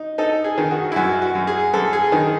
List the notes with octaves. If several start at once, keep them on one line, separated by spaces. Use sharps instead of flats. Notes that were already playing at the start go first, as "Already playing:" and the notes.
Already playing: D#4
D#4 A4
G#4
D#3
F#4
E4
F#2 F#4
F#4
F#2
G#4
F#2 A4
G#4
D#3